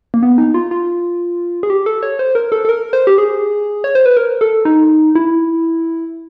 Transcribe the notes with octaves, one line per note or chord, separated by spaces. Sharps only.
A#3
B3
D#4
F4
F4
G#4
G4
A4
C#5
C5
A#4
A4
A4
A#4
C5
G4
G#4
C#5
C5
B4
A#4
A4
D#4
E4